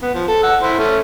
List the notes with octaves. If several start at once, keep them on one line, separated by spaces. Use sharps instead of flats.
B3
F3
A4
F#5 E6
E4 C5
A3 C#4